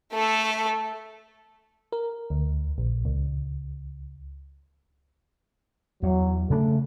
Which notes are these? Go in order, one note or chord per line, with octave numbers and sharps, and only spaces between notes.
A3 A4
A#4
D2
A#1
C#2
E2 F#3
C#3 A3 D4